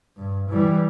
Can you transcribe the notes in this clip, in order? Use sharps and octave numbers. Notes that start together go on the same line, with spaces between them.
G2
E3 G3